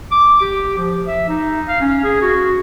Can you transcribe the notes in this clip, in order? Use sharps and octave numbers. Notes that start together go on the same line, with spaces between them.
D6
G4
F3
E5
D#4
F5
C#4
G#4
F#4